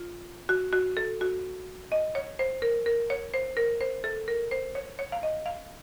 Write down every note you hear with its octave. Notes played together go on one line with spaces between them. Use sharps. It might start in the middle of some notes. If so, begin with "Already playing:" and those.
Already playing: F4
F#4
F#4
A4
F#4
D#5
C#5
C5
A#4
A#4
C#5
C5
A#4
C5
A4
A#4
C5
C#5
C#5
F5
D#5
F5